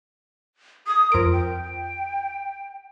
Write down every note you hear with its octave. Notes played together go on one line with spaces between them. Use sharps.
D#6
F2 A#4 D7
G5